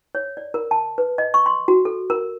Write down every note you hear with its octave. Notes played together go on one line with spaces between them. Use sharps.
C#5
D5
A#4
A5
B4
D#5
C#6
C6
F#4
A4
A#4